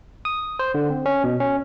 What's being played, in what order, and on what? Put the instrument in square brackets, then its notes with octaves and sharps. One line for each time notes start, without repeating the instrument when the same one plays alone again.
[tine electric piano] D#6
C5
D3
C4
C#4
B2
C#4